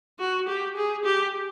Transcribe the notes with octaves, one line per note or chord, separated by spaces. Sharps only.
F#4
G4
G#4
G4